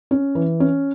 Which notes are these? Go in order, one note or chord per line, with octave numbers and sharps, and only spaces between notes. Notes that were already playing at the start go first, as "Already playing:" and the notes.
C#4
E3
C#4